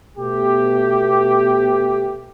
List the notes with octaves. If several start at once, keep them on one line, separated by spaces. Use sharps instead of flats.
B2 A3 B3 G4